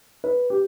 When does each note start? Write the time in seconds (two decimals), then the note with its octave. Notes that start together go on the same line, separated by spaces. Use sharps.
0.24 B4
0.50 G4